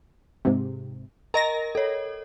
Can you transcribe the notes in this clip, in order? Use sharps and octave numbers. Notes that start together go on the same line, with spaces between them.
G#2 C3
A#4 D#5 A#5 A#6
A4 C#5